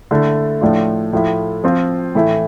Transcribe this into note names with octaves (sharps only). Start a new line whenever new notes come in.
D3 A3 E4
A2 F3 A3 D4 F4
A2 F3 A3 E4
F3 C4 F4
A2 E3 A3 E4